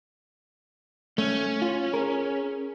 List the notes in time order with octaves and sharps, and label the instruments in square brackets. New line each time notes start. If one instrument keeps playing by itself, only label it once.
[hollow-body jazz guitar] A3 [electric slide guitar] C#4
[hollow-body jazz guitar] F4
G#4 A#4